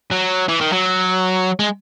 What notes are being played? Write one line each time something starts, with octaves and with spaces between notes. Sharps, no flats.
F#3
E3
D#3
F#3
G#3